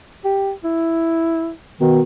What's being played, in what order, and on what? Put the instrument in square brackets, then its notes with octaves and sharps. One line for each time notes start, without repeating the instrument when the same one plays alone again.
[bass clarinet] G4
E4
[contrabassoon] B2 [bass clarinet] D#3